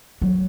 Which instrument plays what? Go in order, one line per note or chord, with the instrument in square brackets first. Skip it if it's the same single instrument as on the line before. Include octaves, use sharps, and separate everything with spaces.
[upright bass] F#3